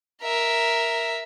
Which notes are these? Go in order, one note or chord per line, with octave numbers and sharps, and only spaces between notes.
A#4 E5